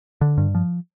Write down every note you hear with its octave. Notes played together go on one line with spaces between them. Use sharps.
D3
G2
F3